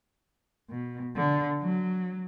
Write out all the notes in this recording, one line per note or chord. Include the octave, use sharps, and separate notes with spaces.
B2
D3
F#3